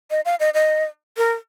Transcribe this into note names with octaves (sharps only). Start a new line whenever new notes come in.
D#5
F5
D#5
D#5
A#4